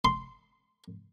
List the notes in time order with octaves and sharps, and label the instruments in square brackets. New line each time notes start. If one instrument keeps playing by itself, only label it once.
[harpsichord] C6